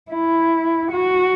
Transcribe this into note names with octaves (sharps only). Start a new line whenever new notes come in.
E4
F#4